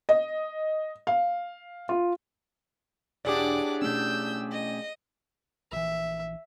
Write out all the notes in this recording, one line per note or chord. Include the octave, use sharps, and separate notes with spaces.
D#5
F5
F4
E1 A2 D4 G4 G#4 D5 F#5 D6
B2 A3 C#4 E6 G6
D#5
A#1 E3 E5